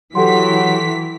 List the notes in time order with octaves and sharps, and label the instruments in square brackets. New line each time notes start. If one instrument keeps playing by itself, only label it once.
[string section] E3 B6 [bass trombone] F#3 [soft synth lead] G4 [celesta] A4 F#5 C6